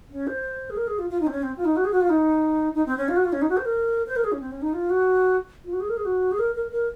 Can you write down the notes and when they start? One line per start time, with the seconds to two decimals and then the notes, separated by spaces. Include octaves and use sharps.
0.10 C#4
0.27 C5
0.70 G#4
0.76 A#4
0.87 G#4
0.99 F4
1.10 F4
1.20 D#4
1.27 C4
1.31 C#4
1.43 C4
1.57 F4
1.65 D#4
1.76 F#4
1.85 G#4
1.92 F#4
2.01 F4
2.09 D#4
2.74 D#4
2.86 C4
2.97 C#4
3.08 F4
3.16 F#4
3.25 F4
3.33 C#4
3.42 D#4
3.49 F#4
3.57 C5
3.65 A#4
4.07 C5
4.16 A#4
4.24 G#4
4.32 C#4
4.40 C4
4.51 C#4
4.62 D#4
4.73 F4
4.90 F#4
5.64 F4
5.73 F#4
5.80 G#4
5.89 A#4
5.97 G#4
6.05 F#4
6.32 G#4
6.39 A#4
6.55 A#4
6.71 A#4